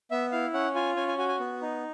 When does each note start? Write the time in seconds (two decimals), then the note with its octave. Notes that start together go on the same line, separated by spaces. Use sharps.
0.11 B3 E5
0.32 E4 F5
0.53 C#4 F#5
0.75 F4 G#5
0.96 C#4 G#5
1.08 G#5
1.18 F#4 G#5
1.29 G#5
1.40 B3
1.62 D#4